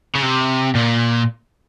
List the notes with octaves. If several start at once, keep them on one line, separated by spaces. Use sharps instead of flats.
C#3
C3
A#2